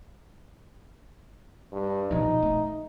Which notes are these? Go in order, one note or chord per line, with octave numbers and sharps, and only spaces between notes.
G2
B2 F3 D#4
A3